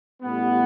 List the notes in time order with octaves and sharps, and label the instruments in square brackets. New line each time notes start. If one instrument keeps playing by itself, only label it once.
[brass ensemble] A1 A2 E3 G3 B3